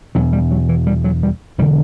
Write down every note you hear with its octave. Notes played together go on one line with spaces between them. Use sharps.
E1 E2 B2 F#3
G3
F#3
E3
G3
F#3
G3
E1 D3 G3